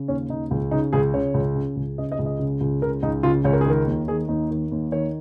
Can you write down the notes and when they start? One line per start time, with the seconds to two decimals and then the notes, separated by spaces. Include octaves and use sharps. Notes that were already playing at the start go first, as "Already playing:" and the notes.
Already playing: C#3
0.08 D#2 C#4
0.29 C#3 D#4
0.51 C#2
0.71 C#3 D#4
0.93 C#2 G#4
1.14 C#3 C#5
1.34 C#2
1.56 C#3
1.76 C#2
1.98 C#3 D#5
2.12 D#5
2.19 C#2
2.26 D#5
2.39 C#3
2.61 C#2
2.82 C#3 A#4
3.03 C#2 D#4
3.23 C#3 F4
3.44 C#2 C#5
3.53 A#4
3.61 G#4
3.66 D#3 A#4
3.87 D#2
4.08 D#3 G#4
4.29 D#2 D#4
4.51 D#3
4.72 D#2
4.92 D#3 C#5